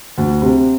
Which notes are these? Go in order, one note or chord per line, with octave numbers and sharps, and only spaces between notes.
D2
C3